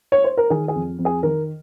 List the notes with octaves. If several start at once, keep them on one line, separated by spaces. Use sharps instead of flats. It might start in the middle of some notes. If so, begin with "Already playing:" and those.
C#5
C5
A#4
D#3 G#4
G#4
F2
F2
G#4
D#3 A#4